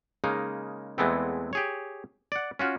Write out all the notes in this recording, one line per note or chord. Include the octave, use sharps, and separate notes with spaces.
C#3 G#3 A#3 D#4
E2 E3 G#3 A3 B3 C4
G4 G#4 C#5
D5 F#5
C#4 F4 F#4